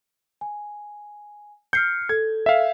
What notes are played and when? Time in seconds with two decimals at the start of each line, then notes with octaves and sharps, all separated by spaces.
0.41 G#5
1.73 F6 G6 C7 C#7
2.09 A4 G#6
2.46 E5 F5